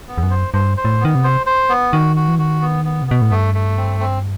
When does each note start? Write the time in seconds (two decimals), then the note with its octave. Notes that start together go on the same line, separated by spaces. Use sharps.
0.08 B3
0.18 E2
0.23 F#2
0.30 C5
0.54 G2 C5
0.77 C5
0.85 A2
1.00 D#3 B3
1.15 C3
1.24 C5
1.46 C5
1.69 B3
1.92 D#3 F#4
2.16 F#4
2.28 E3
2.39 D#3 F#4
2.62 B3
2.85 B3
3.02 C3
3.08 B2 B3
3.22 A2
3.31 G2 A3
3.54 A3
3.77 C4
4.00 C4